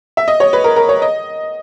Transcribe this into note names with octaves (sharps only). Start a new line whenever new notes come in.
E5
D#5
C#5
B4
A#4
A#4
C#5
D#5